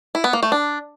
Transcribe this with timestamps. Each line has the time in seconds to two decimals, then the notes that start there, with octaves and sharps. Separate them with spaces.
0.15 E4
0.24 B3
0.33 A#3
0.43 A3
0.52 D4